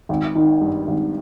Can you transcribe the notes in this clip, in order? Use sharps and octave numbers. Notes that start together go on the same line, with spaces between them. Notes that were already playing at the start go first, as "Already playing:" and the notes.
G#1
D#3
G2
G#1